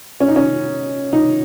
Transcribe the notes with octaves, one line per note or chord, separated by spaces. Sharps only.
C#4
D#4
C#4
D#4